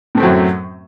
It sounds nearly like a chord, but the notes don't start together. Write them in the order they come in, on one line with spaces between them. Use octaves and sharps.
A2 A3 C4 F#3 F#2